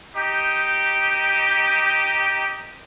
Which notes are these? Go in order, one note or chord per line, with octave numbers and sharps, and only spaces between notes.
D#4 G4